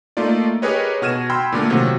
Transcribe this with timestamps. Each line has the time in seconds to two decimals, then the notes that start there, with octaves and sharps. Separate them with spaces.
0.17 A3 A#3 D#4 F4 D5
0.62 G4 G#4 A#4 B4 C#5 D#5
1.02 B2 F#4 F6 G#6 D#7 E7
1.30 G5 B5 C6 E6
1.52 A#2 D3 A3 A#3
1.70 C3 D#3 F#3 F4 F#4